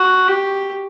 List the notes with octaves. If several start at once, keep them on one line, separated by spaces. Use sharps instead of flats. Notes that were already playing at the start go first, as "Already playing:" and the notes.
Already playing: F#4
G4